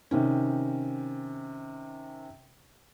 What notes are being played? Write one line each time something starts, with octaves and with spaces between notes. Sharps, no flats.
C3 D#3 C#4